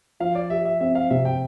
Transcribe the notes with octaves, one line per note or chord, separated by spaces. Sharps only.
F3 F5
D5
G4 E5
E5
C4 E5
F5
C3 E5
G5